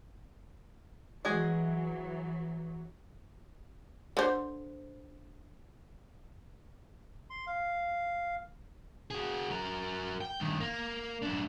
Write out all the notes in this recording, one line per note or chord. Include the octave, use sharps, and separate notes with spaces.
E3 F#3 G#3 F#4 G#4
D3 C5
C6
F5
F#4 G#4
F#3 A#4
G5
G2 D#3
A#3
F#2 D4